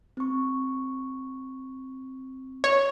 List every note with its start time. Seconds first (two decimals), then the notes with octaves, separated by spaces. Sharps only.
0.17 C4 C#6
2.64 C#5